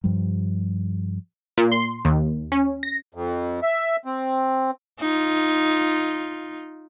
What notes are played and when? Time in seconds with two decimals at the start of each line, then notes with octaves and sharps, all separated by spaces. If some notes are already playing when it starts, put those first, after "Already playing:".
0.04 G2 F3 G3
1.58 A#2
1.72 C6
2.05 D#2
2.52 C#4
2.83 A#6
3.14 F2
3.63 E5
4.05 C4
5.00 D#4 F4